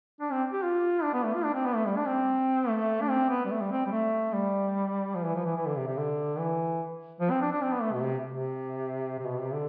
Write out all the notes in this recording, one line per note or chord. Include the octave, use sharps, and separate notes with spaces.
D4
C4
G4
F4
D4
B3
A3
F4
D4
C4
B3
A3
G3
D4
C4
A3
D4
C4
B3
G3
A3
G3
C4
G3
A3
G3
F3
E3
F3
E3
E3
D3
C3
C3
D3
E3
F3
C4
D4
D4
C4
B3
A3
B2
C3
C3
C3
B2
C3
D3